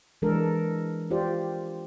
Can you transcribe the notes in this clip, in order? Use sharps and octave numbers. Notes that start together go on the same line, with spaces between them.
E3 G#3 D4 A4 A#4
F4 G4 C5 D5